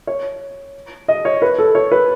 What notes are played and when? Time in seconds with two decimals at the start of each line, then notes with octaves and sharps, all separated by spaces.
0.07 C#5
1.08 D#5
1.25 C#5
1.42 B4
1.58 A4
1.75 C#5
1.92 B4